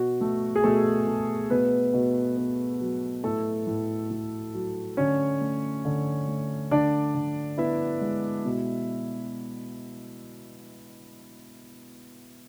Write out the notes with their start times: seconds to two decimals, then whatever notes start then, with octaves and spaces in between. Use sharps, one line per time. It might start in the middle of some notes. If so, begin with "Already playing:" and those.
Already playing: B2 F#4
0.21 A3
0.56 G#4
0.64 B2 A3 A4
1.08 A3
1.50 B2 B3 B4
1.94 B2
2.37 B3
2.81 F#3
3.24 A2 A3 A4
3.67 A2
4.10 A3
4.54 F#3
4.97 D3 C#4 C#5
5.41 A3
5.85 D3
6.28 A3
6.71 D3 D4 D5
7.14 D3
7.58 B3 E4 E5
8.01 G#3
8.45 B2